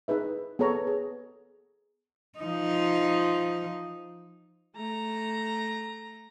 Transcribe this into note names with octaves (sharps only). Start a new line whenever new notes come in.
D#4 G#4 B4 E5
B3 G#4 A4 C#5 A#5
G#4
F3 D#4
A3 A#5